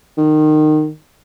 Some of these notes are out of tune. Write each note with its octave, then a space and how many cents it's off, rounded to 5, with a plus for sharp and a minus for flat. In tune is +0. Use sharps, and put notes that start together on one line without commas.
D#3 -20